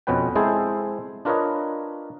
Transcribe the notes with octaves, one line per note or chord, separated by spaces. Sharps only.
F2 B2 B3 C#4 B4 G5
G#3 C4 E4 G#4 A4 C5
D4 F4 A#4 B4 C#5 D#5